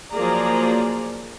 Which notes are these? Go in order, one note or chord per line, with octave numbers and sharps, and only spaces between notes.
F3 F#3 A#3 G#4 D5 A#5